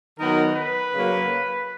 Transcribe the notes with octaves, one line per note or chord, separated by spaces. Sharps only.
D#3 F#3 B3 D#4 A#4
B4
C#3 F#3 A#3